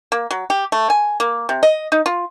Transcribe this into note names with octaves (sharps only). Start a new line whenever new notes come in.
A#3
F#3
G4
A3
G#5
A#3
C3
D#5
D#4
F4